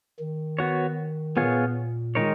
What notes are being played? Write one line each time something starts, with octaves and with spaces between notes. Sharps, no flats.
D#3
B3 F#4 C#5
A#2 B3 F4 G#4 C#5
D#3 G#3 D#4 A#4 C#5